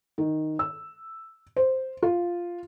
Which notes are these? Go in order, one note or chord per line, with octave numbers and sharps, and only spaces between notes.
D#3
E6
C5
F4